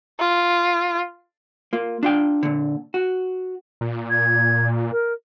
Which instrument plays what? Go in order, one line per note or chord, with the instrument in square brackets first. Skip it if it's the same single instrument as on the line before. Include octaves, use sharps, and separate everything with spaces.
[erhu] F4
[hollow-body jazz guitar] A#3 F4
D4 F4 G5
A#2 D3
F#4
[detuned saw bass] A#2
[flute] G#6
A#4